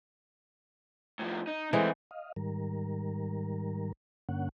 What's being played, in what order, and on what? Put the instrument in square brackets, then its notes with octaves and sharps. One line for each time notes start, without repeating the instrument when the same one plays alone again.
[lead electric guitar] A2 F3
D#4
[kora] E3 G#3 [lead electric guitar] A3 C4
[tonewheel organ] D#5 F5
G#2 D#3 G3 A#4
G2 D3 A#3 C#4 F#5